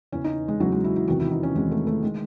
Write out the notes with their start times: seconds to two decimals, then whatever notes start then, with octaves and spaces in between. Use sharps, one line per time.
0.12 E2 C#3 E3 C#4
0.24 D#4
0.48 G#3
0.60 E2 C#3 E3 F#3
0.72 G#3
0.84 E4
0.96 E4
1.08 E2 C3 D#3 F#4
1.20 E4
1.31 D#4
1.43 C#4
1.55 E2 C3 D#3 G#3
1.71 A3
1.87 A3
2.03 D#3 G#3